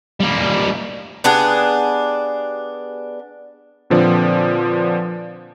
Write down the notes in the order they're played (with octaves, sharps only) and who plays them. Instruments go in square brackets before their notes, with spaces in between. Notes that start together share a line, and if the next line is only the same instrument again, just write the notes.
[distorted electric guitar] G3 A#3
[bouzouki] B3 D4 G4 G#4
[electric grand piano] A#2 D3 F3 C4 B4 D5